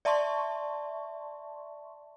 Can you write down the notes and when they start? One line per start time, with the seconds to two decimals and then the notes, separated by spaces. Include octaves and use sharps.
0.05 D5 E5 A5 C6 C#6